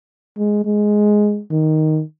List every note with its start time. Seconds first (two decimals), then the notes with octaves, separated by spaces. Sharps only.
0.38 G#3
0.65 G#3
1.50 D#3